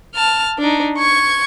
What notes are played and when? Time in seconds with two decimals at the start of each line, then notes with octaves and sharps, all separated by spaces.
0.15 A5 F6
0.59 D4 D#4
0.98 C#6 G#6